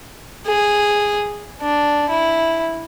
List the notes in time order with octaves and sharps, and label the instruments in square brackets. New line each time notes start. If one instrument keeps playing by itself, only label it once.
[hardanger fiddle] G#4
D4
E4